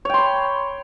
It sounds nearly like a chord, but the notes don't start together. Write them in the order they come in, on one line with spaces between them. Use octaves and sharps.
C#5 G5 C6 B5